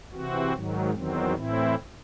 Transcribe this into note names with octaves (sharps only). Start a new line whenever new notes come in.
C3 E3 C4 F#4
G#2 D#3 F#3
E2 D#3 F#3 C4
A2 E3 C4 E4